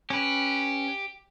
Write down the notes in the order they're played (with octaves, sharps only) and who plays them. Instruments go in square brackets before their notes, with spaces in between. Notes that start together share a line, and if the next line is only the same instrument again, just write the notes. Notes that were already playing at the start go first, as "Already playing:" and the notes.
[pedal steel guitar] C#4 B4 [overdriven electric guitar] G4